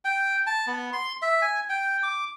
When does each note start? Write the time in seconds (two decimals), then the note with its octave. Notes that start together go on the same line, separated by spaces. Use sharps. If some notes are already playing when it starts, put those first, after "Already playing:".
0.05 G5
0.47 A5
0.67 B3
0.93 C6
1.22 E5
1.42 G#5
1.69 G5
2.03 D6